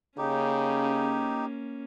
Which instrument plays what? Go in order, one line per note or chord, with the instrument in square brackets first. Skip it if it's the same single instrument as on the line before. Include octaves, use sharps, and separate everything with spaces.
[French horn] C#3 [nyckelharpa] A#3 C#4 [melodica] D#4 G4